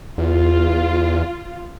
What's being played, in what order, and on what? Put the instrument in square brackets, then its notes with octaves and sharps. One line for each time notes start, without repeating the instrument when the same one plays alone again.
[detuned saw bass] E2 [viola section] F4